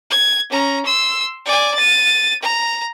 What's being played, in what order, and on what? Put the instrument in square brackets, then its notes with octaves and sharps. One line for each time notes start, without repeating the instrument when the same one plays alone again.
[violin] G#6
C#4 A#5
C6 E6
D5 G#5
A6 D#7
A#5